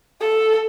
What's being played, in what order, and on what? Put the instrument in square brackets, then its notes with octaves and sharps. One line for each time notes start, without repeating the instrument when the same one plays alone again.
[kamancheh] A4